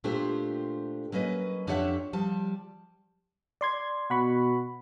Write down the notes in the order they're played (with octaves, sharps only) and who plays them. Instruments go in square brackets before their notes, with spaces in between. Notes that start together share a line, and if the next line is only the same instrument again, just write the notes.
[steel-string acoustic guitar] A#2 A3 D4 F4 G4 C5
F#3 A#3 C#4 B4 D#5
F2 D4 G4 C#5 E5 F#5
F3 G3 A5
[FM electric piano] D5 C6 G#6
[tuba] B2 [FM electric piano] F#5 B5 C#6